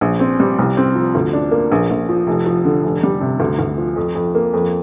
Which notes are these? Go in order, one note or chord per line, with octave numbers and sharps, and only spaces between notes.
A#1
C4
G3
C2
C4
F3
D2
D4
A#3
A#1
A#1
F3
F1
F3
D3
F1
G3
C3
D2
D2
F3
F2
F2
A#3
F2